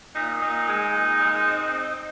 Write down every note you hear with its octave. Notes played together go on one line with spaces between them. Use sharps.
A#2 D#4
A#2 D#4
G#3
A#2
G#3
C4
C4